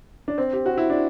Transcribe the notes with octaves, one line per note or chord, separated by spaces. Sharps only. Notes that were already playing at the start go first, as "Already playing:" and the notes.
D4
C4
G4
F#4
E4
D4